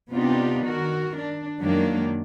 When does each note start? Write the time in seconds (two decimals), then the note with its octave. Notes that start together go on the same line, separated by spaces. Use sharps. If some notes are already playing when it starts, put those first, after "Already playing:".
0.11 C3 B3 D4 D#4 F4 G4
0.66 D#3 F#4 A#4
1.17 D4
1.60 F#2 D#3 F#3 G#3 A#3 D4